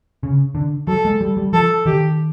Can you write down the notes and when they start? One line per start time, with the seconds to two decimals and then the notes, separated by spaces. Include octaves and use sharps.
0.23 C#3
0.55 D3
0.87 F#3 A4
1.05 G#3
1.21 G3
1.37 G3
1.53 F3 A4
1.86 D#3 G4